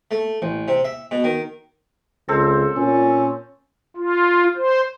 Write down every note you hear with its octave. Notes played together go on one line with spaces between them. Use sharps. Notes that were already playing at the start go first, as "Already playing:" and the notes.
A3
A1
C3
E5
B2
D#3
C#2 C4 A4 C5
A#2 C#4
F4
C5